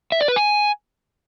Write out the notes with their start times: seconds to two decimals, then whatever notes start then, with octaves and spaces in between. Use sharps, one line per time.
0.12 E5
0.20 D5
0.28 B4
0.36 G#5